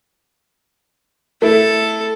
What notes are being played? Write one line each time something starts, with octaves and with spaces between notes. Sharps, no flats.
A3 E4 A4